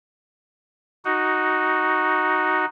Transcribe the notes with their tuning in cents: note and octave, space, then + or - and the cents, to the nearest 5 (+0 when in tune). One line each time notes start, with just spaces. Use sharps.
D#4 +0 F#4 +5